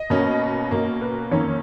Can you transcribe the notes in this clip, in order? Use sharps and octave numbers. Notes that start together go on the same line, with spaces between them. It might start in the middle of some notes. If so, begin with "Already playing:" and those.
Already playing: D#5
B2 A#3 C#4
B2 A#3 C#4
B4
F2 D#3 A#3 C#4 C#5